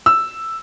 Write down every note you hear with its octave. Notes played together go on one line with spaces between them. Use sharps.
E6